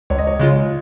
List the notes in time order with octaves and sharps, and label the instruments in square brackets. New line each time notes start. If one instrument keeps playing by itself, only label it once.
[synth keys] C#2 [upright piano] C#5
[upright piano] D#5
C#5
[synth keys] C#3 G#3 F4